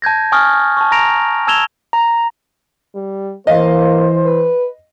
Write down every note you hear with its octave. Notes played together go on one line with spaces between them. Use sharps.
A5 G6 G#6 A#6
G#5 A5 C#6 D#6 F6 A6
A5 C#6
A#5 A#6 D7 F7
A5 E6 G#6 E7 F7 G7
A#5
G3
E3 A#3 C5 D#5 F5
B4